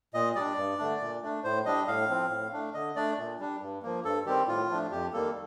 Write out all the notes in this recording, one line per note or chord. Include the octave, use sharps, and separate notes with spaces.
A#2 D#5
G3 D4 D5
G2
D3 A3 D4
A#2
A3 D4
A2 C5
G3 D4 D#5
A2 F5
F3 C4
A2
A3 D4
D3 D#5
A3 D4 D5
A#2
G3 D4
G2
F3 A#3
G2 A4
D#3 G3 C4 G4
A2 F4
F3 A3 D4
F2 G4
D#3 G3 A#3 A4